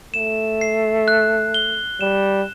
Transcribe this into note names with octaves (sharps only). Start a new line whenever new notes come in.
A3 E7
C7
F#6
G7
G3 E7